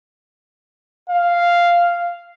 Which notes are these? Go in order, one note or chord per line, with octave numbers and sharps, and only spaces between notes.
F5